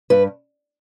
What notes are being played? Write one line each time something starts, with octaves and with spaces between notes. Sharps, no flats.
G2 B4